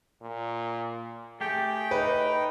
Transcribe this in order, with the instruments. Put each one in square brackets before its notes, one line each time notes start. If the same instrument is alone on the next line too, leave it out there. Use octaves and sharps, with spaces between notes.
[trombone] A#2
[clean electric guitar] A3 G4 [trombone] G#4 [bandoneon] G5
[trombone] D#4 [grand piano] B4